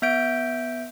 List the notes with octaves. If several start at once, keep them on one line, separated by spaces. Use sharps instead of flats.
B3 E5 G6 D7